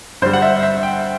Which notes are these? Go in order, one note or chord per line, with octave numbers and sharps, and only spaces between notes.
G2 D3 G3 C5
F#5
E5
E5
G5